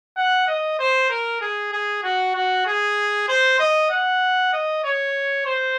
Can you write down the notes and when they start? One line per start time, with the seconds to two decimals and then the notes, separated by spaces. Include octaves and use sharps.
0.17 F#5
0.47 D#5
0.79 C5
1.10 A#4
1.41 G#4
1.73 G#4
2.03 F#4
2.35 F#4
2.66 G#4
3.28 C5
3.60 D#5
3.90 F#5
4.53 D#5
4.84 C#5
5.46 C5